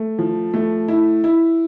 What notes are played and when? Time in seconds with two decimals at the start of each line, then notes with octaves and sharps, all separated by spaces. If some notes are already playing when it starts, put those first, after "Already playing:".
Already playing: A3
0.19 F3
0.54 A3
0.88 E4
1.24 E4